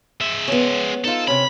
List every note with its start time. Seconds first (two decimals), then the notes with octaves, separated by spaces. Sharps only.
0.21 G#3 E5
0.48 B3 C#4
1.04 D#4 F4 A4
1.28 C3 C#4 B5